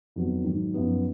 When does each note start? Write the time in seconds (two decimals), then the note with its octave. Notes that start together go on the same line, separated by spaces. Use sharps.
0.16 F2 D#3 F#3 B3 F#4
0.44 G#2 D#3 F#3
0.73 F#2 F3 B3 D#4